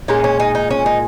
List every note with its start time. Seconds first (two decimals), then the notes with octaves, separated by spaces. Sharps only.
0.08 A#2 G#3 C#4 D#4
0.24 C#4
0.40 D#4
0.55 D#4
0.71 C#4
0.86 D#4